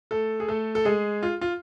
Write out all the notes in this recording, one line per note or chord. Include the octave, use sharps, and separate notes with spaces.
A3 A4
G#4
A3 A4
A4
G#3 G#4
F4
F4